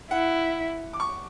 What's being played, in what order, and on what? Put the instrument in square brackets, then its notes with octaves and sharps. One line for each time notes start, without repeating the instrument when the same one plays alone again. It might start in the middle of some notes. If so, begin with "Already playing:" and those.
[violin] E4 [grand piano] F#5
[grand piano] D6
C#6